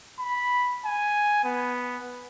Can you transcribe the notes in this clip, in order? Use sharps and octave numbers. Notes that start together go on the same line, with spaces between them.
B5
G#5
B3